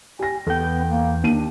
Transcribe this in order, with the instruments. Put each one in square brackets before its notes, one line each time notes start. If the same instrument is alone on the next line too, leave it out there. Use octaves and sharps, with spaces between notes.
[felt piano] G4 A#6 [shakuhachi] G#5
[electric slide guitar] E2 G5 [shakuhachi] B3 [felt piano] A4
[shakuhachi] A#3
[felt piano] D#2 D#7 [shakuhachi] D4